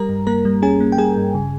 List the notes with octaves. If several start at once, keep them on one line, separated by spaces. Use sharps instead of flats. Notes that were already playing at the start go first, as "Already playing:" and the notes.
Already playing: G3 A#4 A#5
G2
A#3 A#4 A#5
G3
C#4 G#4 G#5
A#3
G5
G3 G#4 G#5
G2
C#3